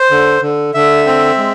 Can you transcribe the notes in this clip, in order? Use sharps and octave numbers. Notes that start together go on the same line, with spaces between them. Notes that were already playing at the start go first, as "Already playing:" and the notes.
Already playing: C5
D3
D3
D3 E5
C4
G#3